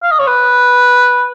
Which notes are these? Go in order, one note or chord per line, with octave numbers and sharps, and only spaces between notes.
F5
D#5
C#5
B4